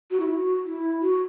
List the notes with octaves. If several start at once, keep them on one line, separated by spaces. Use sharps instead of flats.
F#4
E4
F#4
E4
F#4